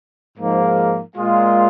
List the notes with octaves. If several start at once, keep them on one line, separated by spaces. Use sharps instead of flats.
G#2 F3 A#3
A#2 G#3 F4